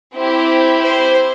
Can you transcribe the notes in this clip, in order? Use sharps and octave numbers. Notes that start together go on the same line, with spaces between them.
C4 E4 G4
C5